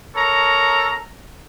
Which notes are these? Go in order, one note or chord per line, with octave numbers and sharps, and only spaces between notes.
A4 A#4 C#5 A#5